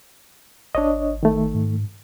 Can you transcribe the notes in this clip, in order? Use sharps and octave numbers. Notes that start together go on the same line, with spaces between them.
G#1 D4 C#5 D#5
D#3 A3
G#2